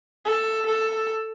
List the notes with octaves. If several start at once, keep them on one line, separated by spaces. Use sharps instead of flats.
A4
A4